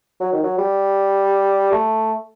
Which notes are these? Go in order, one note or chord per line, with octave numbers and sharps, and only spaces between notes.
F#3
D#3
F#3
G3
A3